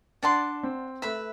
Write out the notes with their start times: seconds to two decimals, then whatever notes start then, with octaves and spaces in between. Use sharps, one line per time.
0.23 D4 D5 F#5 A5 C6
0.63 C4
1.02 A3 B4 E5 B5